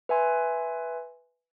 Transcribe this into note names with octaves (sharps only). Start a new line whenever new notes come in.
B4 E5 G#5 C6